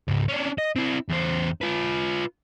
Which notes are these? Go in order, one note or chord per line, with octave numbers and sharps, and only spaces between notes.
C#2 G#2
C#4 D4
D#5
C4 E4
E2 C5
F4 B4